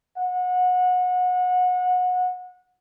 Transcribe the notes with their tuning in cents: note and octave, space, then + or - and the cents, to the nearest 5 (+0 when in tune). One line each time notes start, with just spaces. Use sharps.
F#5 -25